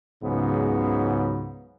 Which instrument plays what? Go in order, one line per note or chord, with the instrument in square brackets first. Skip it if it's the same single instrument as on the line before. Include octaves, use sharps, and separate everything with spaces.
[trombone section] C#2 G#2 C#3 F#3 B3